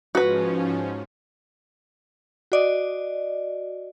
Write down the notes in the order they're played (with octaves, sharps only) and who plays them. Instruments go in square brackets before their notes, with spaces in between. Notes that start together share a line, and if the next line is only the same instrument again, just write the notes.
[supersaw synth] G#2 F3 C#4 [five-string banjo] F#4 B4
[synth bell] F#4 D5 D#5